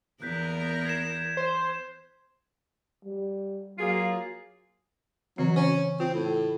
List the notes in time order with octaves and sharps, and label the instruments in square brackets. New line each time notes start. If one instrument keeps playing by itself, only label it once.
[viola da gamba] E2 B3 A#4 [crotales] F#6 G6 B6
[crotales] G#6 C7 E7
[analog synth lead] C5
[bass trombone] G3
[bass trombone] F#3 [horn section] A#3 F4 G#4
[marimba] C#3 E3 C4 [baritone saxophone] F#3
[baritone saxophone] C#4 [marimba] C5
[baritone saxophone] C4 [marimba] F4
[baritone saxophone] A2